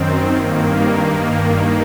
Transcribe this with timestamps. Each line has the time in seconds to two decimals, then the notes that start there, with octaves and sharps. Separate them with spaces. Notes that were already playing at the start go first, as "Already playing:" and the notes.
Already playing: F#2 D#3 C4
0.29 G2 D#3 A#3
1.03 G2 D#3
1.40 A#3